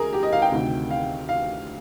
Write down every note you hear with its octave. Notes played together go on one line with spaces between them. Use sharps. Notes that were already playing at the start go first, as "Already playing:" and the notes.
Already playing: D2 G#4 A#4
G4
D#5
F5
G5
D2 C3 D#3
F5
F5